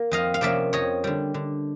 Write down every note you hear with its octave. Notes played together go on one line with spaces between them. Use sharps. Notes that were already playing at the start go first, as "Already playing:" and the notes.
Already playing: A#3
F2 D#5 F5
F5
C3 F3 A#3 C#4 D5 E5
F2 C#5 D#5
D3 G3
D3